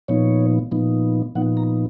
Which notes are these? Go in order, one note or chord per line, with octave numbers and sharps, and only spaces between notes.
A#2 F3 B3 D#4 C#5
A#2 F3 B3 D#4
A#2 F3 B3 D#4 F#5
A#5